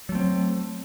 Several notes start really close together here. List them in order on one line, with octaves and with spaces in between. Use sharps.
F#3 A3 C4